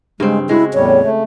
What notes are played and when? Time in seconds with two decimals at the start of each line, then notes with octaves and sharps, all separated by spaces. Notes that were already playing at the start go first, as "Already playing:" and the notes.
0.20 G2 C#3 G#3 C4
0.49 G#3 E4 F#4
0.74 E2 A2 G3 C#5
1.02 A3